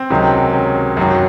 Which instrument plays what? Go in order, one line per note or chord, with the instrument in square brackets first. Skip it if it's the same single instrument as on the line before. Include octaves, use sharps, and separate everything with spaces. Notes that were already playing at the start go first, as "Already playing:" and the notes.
Already playing: [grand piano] C4
C#2 C3 D#3 F#3
C#4
F#2 D#3 F#3